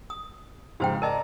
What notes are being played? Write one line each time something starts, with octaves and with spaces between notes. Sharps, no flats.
D#6
F2 G#2 C#3 G4 C5 G5
A#4 D5 D#5 A5 A#5